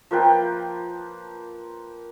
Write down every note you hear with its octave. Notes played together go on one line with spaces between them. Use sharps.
F3 A#3 B4 G5